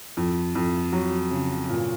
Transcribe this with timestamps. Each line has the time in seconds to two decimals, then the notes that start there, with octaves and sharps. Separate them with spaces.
0.17 F2
0.55 F2
0.93 F#3
1.31 C#3
1.70 A#2